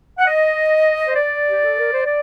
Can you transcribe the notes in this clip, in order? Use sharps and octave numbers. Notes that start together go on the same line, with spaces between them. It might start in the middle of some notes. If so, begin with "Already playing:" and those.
F#5
D#5
C5
D5
G4
A4
A#4
C5
D5